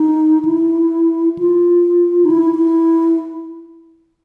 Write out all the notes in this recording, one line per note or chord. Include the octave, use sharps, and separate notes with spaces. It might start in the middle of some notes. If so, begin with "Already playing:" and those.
Already playing: D#4
E4
F4
D#4
E4
E4